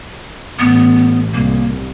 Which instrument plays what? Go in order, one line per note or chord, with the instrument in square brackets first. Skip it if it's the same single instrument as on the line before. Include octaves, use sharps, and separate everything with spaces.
[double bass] A1 [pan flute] B3
[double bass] C2 [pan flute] A#3